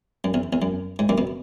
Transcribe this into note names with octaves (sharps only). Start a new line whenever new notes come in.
F#2
E2
E2
F#2
G#2
F#2 A#2
B2